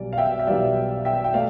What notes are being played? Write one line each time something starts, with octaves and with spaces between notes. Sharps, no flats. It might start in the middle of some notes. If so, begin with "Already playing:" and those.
Already playing: B1 B2 G3 D5
F5
E5 G5
E5
B1 B2 G3 D5 F5
E5 G5
G5
A3 D5 F5